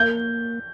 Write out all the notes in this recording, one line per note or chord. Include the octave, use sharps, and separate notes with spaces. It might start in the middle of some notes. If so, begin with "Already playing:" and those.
Already playing: A#3 G6